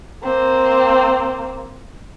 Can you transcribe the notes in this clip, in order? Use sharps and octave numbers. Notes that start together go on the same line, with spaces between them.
A#3 C4